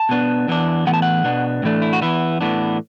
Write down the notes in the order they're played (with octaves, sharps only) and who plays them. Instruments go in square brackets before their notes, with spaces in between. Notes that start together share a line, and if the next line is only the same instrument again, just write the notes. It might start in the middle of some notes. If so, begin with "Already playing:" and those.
Already playing: [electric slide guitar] A5
B2 B3 D4
E2 E3 D4
A2 E3 B3 F#5
A5
F#5
B2 B3 D4
A2 E3 A3 D4
E4
F#4
E2 E3 B3 E4
A2 E3 B3 D4